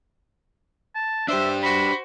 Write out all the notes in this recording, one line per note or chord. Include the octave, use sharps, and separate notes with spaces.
A5
D4 G4 C5 E5
F#4 C5 B5